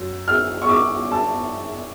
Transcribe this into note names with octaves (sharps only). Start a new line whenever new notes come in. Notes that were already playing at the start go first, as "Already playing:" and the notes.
Already playing: F#2 F#3
F6
C#6
D6
A5